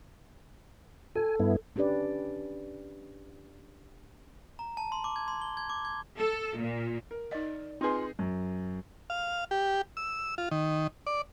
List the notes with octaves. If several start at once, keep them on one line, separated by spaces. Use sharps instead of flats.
A4 G#5
G2 B3 E4
C#4 D4 G4 B4 D5
A#5
A5
C6
D6
G#6
C6
G7
G#6
D6
G#6
A4
A#2
A#4
D#4 D5 D#5
C4 D#4 F4 G#4 B4 C6
F#2
F5
G4
E6
F4
D#3
D5